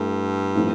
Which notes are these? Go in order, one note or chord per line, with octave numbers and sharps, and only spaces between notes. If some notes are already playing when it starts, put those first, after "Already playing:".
Already playing: G2 A3 E4 A4
A2 F3 A3 C4 E4